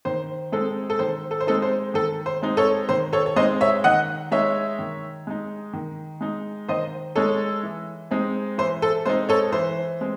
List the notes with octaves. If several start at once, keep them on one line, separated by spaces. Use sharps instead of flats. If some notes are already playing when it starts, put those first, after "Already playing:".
D#3 C5
G#3 C4 D#4 A4
A4
D#3 C5
A4
C5
G#3 C4 D#4 A4
C5
D#3 A4
C5
G#3 C4 D#4
A4 C#5
D#3 C5
A4 C#5
C#5
G#3 C4 D#4 C5 D#5
C#5 E5
D#3 D#5 F#5
G#3 D#4 C#5 E5
D#3
G#3 D#4
D#3
G#3 D#4
D#3 C5 D#5
G#3 D#4 A4 C#5
E3
G#3 C4 D#4
E3 C5
A4
G#3 C4 D#4 C5
A4 C#5
E3 C5
G#3 C4